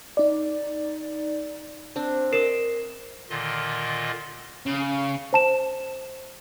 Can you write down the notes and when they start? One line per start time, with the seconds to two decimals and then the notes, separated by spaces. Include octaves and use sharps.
0.17 D#4 D5
1.96 C4 D4
2.32 A#4 D5 D#5 C7 E7
3.30 A#2 D3 D#3 F4 D#5
4.66 C#3
5.33 C5 A5 E7